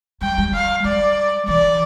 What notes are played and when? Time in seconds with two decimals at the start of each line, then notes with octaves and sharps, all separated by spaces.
0.21 G3 G5
0.38 G3
0.53 F5
0.85 G3 D5
1.48 E3 D5